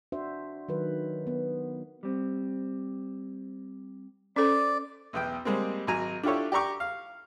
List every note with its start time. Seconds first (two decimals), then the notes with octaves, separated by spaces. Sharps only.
0.12 D4 F#4 C5 E5
0.68 D#3 F#3 B4
1.27 B3
2.03 G3 C4
4.36 C#4 A4 C5 D5
5.13 B1 E2 G5
5.45 G3 G#3 A#3 C4
5.87 G#1 F#3 G#5 A#5
6.23 D4 E4 F4 G4 A4 C#5
6.52 G4 D5 A#5 C#6 D6
6.80 F5